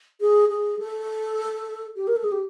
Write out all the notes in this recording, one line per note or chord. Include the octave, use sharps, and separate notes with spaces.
G#4
G#4
A4
G4
A#4
A4
G#4
G4